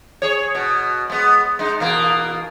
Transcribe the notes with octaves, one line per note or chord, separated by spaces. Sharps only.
G#4 C#5
B2
G#3 B3
G#3 D#4
E2 B2 A#3